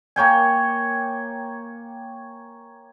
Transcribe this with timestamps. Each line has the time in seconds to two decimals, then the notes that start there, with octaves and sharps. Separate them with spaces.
0.16 A#3 C#5 G5 G#5